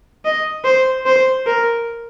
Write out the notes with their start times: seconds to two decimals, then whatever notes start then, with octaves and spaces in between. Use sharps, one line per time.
0.25 D#5
0.65 C5
1.06 C5
1.46 A#4